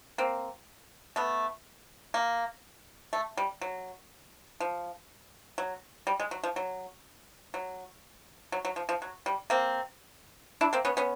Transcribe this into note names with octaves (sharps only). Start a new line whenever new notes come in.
A#3 C4
A3 B3
A#3
A3
G3
F#3
F3
F#3
G3
G#3
F#3
F3
F#3
F#3
F#3
F#3
F3
F3
F#3
G3
A#3 C4
D4 E4
A#3 C4
B3 C#4
B3 C#4